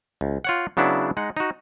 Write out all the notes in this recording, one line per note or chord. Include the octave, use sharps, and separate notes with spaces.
C#2
F4 C#5 F#5
C#3 F#3 B3 D4 E4
G#3 D#4 F#5
D#4 F#4